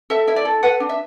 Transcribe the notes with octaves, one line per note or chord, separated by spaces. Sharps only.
A4 E5
E4 E5
D5
A4
B4 F#5
D4
E5